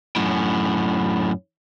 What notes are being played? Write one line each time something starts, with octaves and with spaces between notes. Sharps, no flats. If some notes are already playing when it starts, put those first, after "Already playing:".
F#2 A2